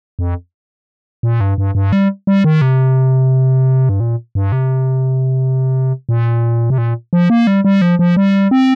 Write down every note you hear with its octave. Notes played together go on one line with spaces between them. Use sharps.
F2
A#2
G2
G2
G2
G3
G3
D#3
C3
G2
A#2
G2
C3
A#2
C3
A#2
F3
A#3
G3
G3
F3
F3
G3
C4